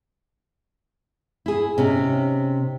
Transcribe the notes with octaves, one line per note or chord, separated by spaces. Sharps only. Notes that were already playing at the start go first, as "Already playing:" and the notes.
E4 G#4
C3 C#4 D#4